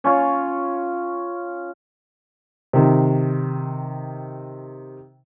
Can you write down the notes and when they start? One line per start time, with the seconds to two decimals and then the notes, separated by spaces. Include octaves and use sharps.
0.04 C#4 F4 C#5
2.73 C3 D#3